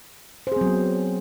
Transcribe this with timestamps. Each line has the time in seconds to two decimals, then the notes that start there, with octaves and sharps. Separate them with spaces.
0.47 C5
0.52 G#4
0.56 C4
0.61 F#3
0.66 B3